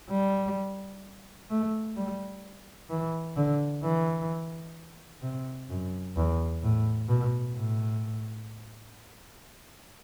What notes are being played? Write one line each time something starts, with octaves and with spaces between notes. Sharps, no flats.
G3
A3
G3
E3
D3
E3
C3
F#2
E2
A2
B2
A2